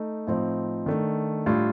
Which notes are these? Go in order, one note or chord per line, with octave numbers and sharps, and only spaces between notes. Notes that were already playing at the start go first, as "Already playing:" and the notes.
Already playing: A3 D#4
A2 F3 C4 D#4
D#3 A3 D4
A2 G3 D4 F4